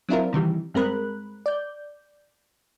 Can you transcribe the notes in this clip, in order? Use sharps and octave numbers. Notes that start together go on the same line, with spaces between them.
F#3 C4 D4 E4 F4 A#4
C3 D#3 E3 G3
G2 G#3 C4 A#4 B5 F#6
D5 G6